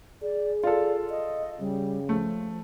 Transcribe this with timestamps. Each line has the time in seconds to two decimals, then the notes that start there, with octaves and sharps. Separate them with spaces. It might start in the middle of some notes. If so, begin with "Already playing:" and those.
0.22 G#4 D5
0.64 F4 A4 D5
1.10 D#5
1.60 C#3 G3
2.09 F3 A3